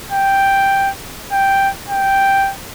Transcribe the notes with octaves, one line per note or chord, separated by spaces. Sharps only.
G5
G5
G5